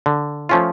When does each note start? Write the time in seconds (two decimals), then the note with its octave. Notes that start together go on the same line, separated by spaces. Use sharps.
0.06 D3
0.49 F3 A3 C#4 F4